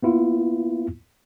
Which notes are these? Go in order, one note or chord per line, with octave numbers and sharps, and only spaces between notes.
A#3 B3 E4 F4